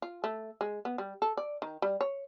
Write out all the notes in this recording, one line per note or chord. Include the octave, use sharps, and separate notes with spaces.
F4
A3
G#3
B3
G3
A4
D5
D#3
G3
C#5